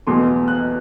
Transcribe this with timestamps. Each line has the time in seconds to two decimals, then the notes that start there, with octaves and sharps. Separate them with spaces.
0.07 E2 B2 A3 C6
0.48 F#6